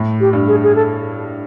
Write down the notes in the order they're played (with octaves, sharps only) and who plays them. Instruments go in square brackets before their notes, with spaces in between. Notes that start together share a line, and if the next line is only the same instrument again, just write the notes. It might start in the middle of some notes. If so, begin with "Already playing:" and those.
Already playing: [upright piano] A2
[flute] G4
[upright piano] G2
[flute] G#4
G#4
A4